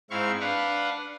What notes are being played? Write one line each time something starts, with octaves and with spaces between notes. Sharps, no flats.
G#2 C4 E4 F5 C#6
D4 B4 F5 F#5